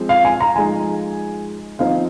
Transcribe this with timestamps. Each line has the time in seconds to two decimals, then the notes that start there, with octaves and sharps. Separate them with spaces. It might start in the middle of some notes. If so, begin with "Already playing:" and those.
Already playing: F3 G#3 C4
0.09 F5
0.25 G#5
0.41 A#5
0.56 F3 G#3 D#4 G#5
1.79 F3 C4 D#4 F5